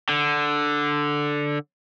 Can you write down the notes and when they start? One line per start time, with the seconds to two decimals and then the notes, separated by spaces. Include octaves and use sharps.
0.09 D3